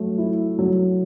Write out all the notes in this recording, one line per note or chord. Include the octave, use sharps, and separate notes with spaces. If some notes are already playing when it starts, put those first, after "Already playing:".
Already playing: F#3 A3
E4
F#3